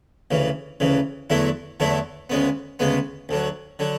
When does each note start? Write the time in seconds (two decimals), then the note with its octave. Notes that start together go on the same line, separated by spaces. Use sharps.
0.31 D2 C#3 E3
0.80 D2 C#3 E3
1.30 E2 D3 F#3 A3 E4
1.80 E2 D3 F#3 A3 E4
2.30 D2 C#3 G#3 B3
2.79 D2 C#3 G#3 B3
3.29 D2 D3 F#3
3.79 D3 F#3